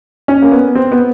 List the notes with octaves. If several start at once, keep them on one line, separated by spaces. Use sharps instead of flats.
C#4
A#3
B3
C4
B3